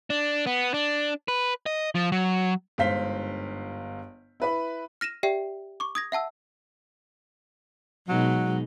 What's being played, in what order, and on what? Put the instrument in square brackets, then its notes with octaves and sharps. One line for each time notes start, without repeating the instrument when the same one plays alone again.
[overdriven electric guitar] D4
B3
D4
B4
D#5
F3
F#3
[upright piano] G1 G#2 C5 F5 B6 G7
E4 B4 B5
[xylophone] F6 A#6 D#7 E7
G4 D5 E5 G5 C7
C#6 D6
D#6 G#6 A#6
E5 F#5 A5 E6
[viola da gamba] B2 G#3 D#4 [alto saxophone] F#3